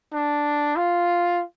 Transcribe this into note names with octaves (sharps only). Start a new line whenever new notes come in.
D4
F4